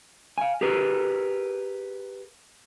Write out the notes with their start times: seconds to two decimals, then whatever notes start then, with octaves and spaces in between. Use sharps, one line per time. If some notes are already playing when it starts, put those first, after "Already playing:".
0.38 F5 G#5
0.61 G4 G#4 A#4 B4